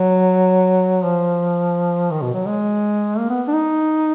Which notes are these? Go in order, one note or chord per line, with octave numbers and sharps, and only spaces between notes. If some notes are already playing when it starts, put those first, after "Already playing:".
Already playing: F#3
F3
D#3
B2
F#3
G#3
A#3
B3
D4
D#4